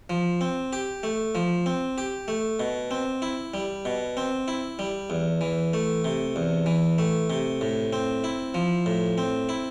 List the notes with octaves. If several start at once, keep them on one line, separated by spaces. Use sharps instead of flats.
F3
C4
G4
A3
F3
C4
G4
A3
B2
C4
E4
G3
B2
C4
E4
G3
E2
E3
A3
C3
E2
E3
A3
C3
A2
C4
E4
F3
A2
C4
E4